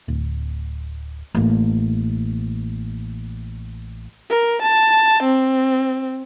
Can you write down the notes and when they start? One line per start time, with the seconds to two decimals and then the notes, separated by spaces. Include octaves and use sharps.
0.08 D1
1.35 A1 A#3
4.30 A#4
4.63 A5
5.24 C4